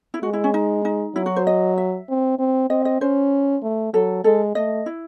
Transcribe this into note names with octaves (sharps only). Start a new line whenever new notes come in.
E4
G#3 F#4
E4
C#4
D#4
D#4
F#3 E4
F#4
C5
D#5
E5
C4
C4
C4 D#5
D#5
C#4 C5
A3
F#3 A4
G#3 A4
A3 D#5
E4